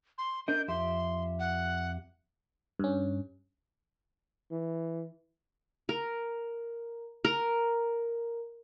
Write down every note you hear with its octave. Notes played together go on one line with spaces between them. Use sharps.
C6
D4 A#4 D#5 G6
F2 G4 E5 C6
F#5
G2 C#4
E3
A#4
A#4